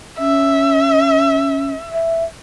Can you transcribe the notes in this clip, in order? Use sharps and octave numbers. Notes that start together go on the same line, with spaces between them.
C#4 E5
E5